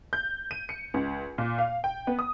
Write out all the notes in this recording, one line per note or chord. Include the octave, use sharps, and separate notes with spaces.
G6
D#7
C#7
C#2
A#2
F5
G5
B3
D#6